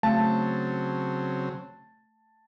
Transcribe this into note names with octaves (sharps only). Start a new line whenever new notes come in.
C#3 F#3 A3 C4 A5